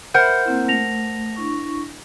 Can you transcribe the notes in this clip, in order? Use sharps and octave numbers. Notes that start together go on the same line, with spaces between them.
A#4 C5 E5 F#5 B5 G6
A#3 C4 E4
A3 A#6 F7
D4 E4 C#6